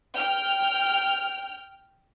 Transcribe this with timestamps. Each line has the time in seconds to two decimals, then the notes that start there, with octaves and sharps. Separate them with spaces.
0.12 G5 F6